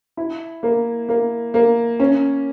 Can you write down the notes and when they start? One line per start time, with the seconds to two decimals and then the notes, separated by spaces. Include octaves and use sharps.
0.17 E4
0.63 A#3
1.09 A#3
1.54 A#3
2.00 C#4